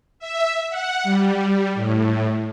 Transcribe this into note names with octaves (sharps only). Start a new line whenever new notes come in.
E5
F#5
G3
A2